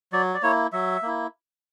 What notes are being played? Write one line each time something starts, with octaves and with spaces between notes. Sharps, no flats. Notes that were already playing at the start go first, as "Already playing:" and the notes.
F#3 D5
D5
A#3 E4 C#5
F#3 E5
A#3 E4